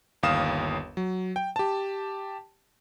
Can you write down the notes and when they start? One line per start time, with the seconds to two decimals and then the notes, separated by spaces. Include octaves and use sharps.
0.23 G1 D#2 F5 D#6 E7
0.97 F#3
1.36 G5
1.56 G4 A5